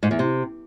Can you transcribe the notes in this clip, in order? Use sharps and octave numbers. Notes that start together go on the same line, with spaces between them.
G#2
E2
C3